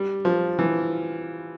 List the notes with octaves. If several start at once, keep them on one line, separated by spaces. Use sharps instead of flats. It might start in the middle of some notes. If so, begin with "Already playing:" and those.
Already playing: G3
F3
E3